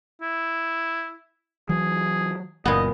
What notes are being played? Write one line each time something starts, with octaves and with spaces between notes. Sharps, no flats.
E4
E3 F#3 G#4
F#1 A#2 B3 D#5